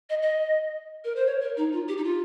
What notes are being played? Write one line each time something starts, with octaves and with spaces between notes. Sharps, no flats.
D#5
D#5
A#4
C5
C#5
A#4
D#4
F4
G4
D#4
F4